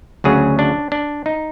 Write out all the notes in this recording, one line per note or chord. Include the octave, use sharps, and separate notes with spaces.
D2 C#3 F#3 G#4
D4
D4
D#4